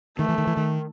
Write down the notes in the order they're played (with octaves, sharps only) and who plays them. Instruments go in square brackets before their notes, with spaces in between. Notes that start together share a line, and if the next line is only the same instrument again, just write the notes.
[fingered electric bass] D#3 [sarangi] A3
[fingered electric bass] E3
D#3
E3
D#3